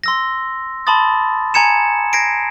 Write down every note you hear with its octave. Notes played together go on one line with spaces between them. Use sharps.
C6 E6 A#6
A5 B5 C6 D#6 A6
G#5 A#5 G#6 C#7 E7
G#6 A#6 C7 D7